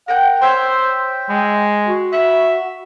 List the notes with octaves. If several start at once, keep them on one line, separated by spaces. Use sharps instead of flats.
A#4 F#5 G5 G6
C5 C#5 E5 G5 C6
G#3
F#4
E5 F#5 B5